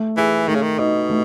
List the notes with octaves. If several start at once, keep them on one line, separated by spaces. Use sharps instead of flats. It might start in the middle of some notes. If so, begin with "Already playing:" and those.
Already playing: A3
E3 G#4
D#3 A3
C#3
D#3
B2 D#4
A3